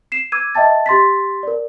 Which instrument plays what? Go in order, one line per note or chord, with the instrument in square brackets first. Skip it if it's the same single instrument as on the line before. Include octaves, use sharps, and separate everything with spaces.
[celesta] C7 E7
D6 E6 G#6 D#7
D#5 E5 G5 A5 A6
G4 C6 A6 B6
A#4 D5